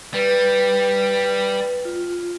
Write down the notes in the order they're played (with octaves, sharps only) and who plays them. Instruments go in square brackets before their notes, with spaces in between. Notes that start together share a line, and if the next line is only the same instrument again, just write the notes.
[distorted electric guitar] G3 [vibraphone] B4
[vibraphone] F4